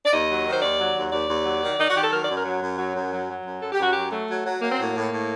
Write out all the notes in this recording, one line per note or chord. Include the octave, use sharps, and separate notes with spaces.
D5
D#2 D#5
F#3
D#3
C5
D#2 D5
F#3
D#2
D#2 D5
D#2
F#3
D#3
D#3 D#4
F#4
D#3 G4
A4
F#3 A#4
F#2 D5
A#4
F#3
F#2
F#3
F#2
F#3
F#3
F#2
F#2 A4
G4
F#2 F#4
F#3 G4
F#3 A3
F#3
F#3
F#3 A#3
C4
A2 A#3
A2
A2